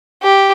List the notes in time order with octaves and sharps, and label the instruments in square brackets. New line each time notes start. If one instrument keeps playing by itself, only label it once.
[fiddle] G4